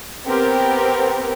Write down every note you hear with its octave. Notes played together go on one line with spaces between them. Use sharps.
B3 C4 G4 A#4